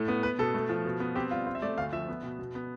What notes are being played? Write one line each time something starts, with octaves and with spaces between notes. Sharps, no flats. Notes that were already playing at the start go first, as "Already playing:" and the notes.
Already playing: A2 A3
B3
B3 B4
B2 A4
A3
F3
B2
B3
C4 G4
G3 F4
C4 F4
E5
A3 D5
D2 F5
F3 E5
B3
B2
B2
B3